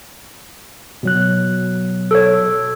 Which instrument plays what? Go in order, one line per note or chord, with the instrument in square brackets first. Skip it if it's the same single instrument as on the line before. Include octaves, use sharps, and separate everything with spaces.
[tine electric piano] B2 F#3 F#6
[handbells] A4 C#5